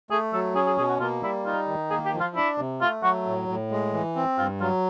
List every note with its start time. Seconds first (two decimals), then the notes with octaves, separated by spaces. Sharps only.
0.10 A3 G#4
0.33 F#3 A4
0.55 C#4 G#4
0.67 G#4
0.78 B2 G#4
0.89 F#4
1.00 A#3 F4
1.22 G3 E4
1.45 D#4 F4
1.68 D#3
1.90 A#3 G#4
2.05 G4
2.14 F3
2.20 F4
2.35 D4 E4
2.58 C3
2.81 A3 F4
3.03 F#3 F#4
3.26 A2
3.48 A2
3.71 G#3
3.93 E3
4.16 C4
4.38 G2 F4
4.61 F#3 F4